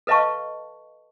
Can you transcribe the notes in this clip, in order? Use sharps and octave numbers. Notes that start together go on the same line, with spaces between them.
A4 B4 D#5 F5 A5 C#6